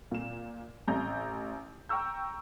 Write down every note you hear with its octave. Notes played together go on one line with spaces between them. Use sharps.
A#2 E7
A1 A#5 G6
G5 A#5 C#6 E6 G6